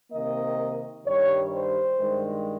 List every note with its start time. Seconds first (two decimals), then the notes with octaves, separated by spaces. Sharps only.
0.11 C3 D#3 A#3 D#5
1.05 G2 D#3 G3 C#5
1.52 C5
1.98 G2 D#3 G#3